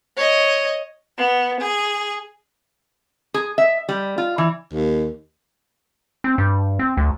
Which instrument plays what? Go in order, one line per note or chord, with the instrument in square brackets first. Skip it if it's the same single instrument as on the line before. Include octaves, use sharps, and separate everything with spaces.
[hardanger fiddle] C#5 D#5
[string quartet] B3
G#4
[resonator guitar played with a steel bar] G#4
E5
G3
F4
E3
[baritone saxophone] D#2
[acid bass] C4
G2
C4
D2